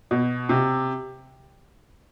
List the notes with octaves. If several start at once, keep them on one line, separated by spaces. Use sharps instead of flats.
B2
C3